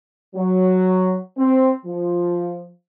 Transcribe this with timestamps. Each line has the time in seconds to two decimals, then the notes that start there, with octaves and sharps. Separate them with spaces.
0.35 F#3
1.37 C4
1.86 F3